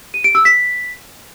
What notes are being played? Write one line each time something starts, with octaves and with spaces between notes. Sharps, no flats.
D#7
D7
E6
B6